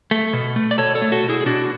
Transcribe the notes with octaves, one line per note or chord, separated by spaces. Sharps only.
A3
B2
A3
D5
B2 A4 C#5
A4 C#5
A3
F#4 A4
B2
E4 G#4
G#4
B2 D4 F#4